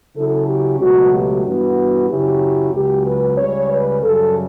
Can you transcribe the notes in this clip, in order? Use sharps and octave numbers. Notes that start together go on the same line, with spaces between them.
C#3 F#3 C#4 E4 A4
G4
C#2 B2 F#3 A3 F#4
G4
G2 E3 B3 F#4
F#2 C#3 F#3 C#4 E4 G4
C#2 C#3 F#3 C#4 G4
B4
C#2 C#3 G3 C#5
B4
F#2 C#3 G3 A4